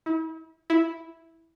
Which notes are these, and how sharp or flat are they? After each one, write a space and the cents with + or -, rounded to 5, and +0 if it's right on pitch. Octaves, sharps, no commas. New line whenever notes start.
E4 -40
E4 -5